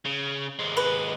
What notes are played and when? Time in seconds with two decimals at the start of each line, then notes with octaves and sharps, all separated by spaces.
0.05 C#3
0.59 D#2 G#3
0.77 B4